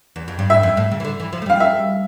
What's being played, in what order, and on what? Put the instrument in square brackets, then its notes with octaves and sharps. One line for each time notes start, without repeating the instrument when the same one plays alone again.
[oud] E2
F2
G2
[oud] A2 [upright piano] E5
[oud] F2
A2
C#3
E3
D3
E3
F3
A3
[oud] G3 [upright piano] F5
[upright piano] E5